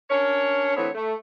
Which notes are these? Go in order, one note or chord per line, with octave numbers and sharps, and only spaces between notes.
C#4 D4 A#4 C#5
D3 E3 A3 B3 C4 C#5
A3